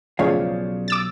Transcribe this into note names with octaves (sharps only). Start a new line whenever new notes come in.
B1 C#3 F3 C#5 D5 F5 C#6
D6 E6 A6